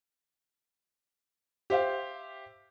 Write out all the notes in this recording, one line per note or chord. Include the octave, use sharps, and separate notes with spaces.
G4 C5 E5 F5